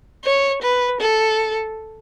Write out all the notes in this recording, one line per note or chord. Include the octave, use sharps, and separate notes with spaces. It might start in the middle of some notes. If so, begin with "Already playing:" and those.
C#5
B4
A4